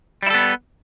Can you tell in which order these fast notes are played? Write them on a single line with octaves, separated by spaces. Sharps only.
G3 E4 A4 B3